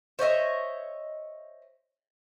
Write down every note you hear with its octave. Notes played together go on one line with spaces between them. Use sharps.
C5 C#5 D#5 E5